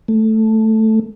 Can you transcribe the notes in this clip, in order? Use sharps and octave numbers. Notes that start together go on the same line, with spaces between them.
A3